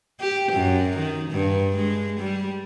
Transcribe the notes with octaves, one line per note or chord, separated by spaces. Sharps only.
G4
F#2
D#3
G2
G#3
G3